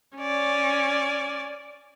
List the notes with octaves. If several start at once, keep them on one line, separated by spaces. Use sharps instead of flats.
C#4 D5